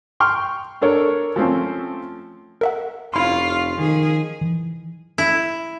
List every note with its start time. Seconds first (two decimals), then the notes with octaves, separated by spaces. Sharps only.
0.20 G5 C6 C#6 F6
0.81 D4 A4 A#4 C#5
1.36 F3 A3 C4 C#4
2.61 A#4 E5 F#5
3.14 F1 C#4 E4 F4 C6
3.78 D#3 F3 G#4
4.41 E3
5.18 E4